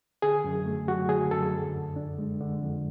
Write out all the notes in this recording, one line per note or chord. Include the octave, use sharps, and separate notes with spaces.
D3 G#4
F#2
A3
F#3 F#4
D3 G#4
F#2 A4
D3
F2
D4
G#3
D3
F2